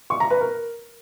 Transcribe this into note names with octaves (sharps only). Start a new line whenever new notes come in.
C#6
A#5
B4
A#4